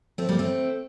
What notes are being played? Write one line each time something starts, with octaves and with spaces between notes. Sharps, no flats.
A3 C4
G3 A#3
A3 C4